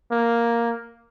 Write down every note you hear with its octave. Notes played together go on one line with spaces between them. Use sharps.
A#3